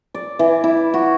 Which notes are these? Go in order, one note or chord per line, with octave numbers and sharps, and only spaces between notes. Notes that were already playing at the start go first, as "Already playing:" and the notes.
D5
E3
E4
F#4